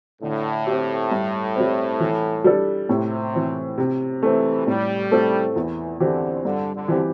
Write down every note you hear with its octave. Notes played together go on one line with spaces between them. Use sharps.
A2 D3
C4 G4
G2
G3 C4
E3
G3 D4 A4
A2 C3
E3 C4
C3
E3 A3 C4
A2 G3
A3 C4 A4
E2 E3
D3 E3 C4 G4
G2 D3
D3
E3 C4 G4